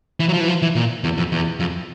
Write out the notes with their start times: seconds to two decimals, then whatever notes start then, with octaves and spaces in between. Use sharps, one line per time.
0.20 E3
0.29 F#3
0.34 F3
0.40 E3
0.48 F3
0.62 E3
0.75 A#2
1.04 E2
1.17 F2
1.32 E2
1.60 F2